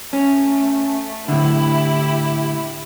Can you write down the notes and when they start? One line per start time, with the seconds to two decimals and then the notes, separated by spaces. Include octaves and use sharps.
0.13 A3 C#4
1.28 A2 D3 E4 G4